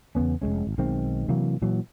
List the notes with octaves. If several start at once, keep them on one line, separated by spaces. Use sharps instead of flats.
E2 C#3 B3 C#4
F1 E2 G#3 C#4
G#1
B1 D#3 G#3 C4
C3 E3 F#3 A#3
A#2 E3 F#3